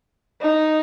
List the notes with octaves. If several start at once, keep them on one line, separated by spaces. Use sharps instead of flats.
D#4